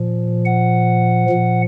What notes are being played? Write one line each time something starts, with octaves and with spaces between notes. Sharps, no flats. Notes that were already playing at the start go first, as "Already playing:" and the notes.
Already playing: A#2 F3
F#5
A#2 F3